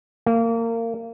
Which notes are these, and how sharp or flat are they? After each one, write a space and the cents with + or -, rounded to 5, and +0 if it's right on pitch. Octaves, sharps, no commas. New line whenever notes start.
A#3 -25